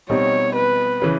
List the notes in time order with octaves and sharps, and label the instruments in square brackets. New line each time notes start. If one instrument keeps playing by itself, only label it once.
[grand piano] B2 G3 C4 D#4 [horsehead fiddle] C#5
[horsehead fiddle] B4
[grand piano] C#3 E3